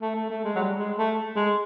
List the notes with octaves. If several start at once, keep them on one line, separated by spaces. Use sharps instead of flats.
A3
A3
A3
G#3
F#3
G3
G#3
A3
G#3